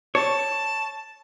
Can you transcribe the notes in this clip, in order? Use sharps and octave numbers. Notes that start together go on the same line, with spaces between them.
C#5 A5